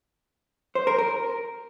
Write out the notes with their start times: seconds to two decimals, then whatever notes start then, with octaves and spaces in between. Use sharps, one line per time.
0.75 C5
0.87 A#4
0.99 A#4